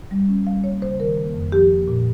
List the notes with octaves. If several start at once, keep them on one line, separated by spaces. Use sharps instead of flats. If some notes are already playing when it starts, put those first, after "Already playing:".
G3
C#4
G3 F5
A#3 C#5
C#3 C5
D#3 A#4
A#3
F2
F3 G4
A#3
A#2